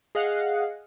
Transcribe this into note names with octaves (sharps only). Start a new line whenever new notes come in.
G#4 D#5 F5 F#5